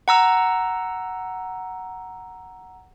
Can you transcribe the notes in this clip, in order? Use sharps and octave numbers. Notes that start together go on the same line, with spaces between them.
F#5 A#5 E6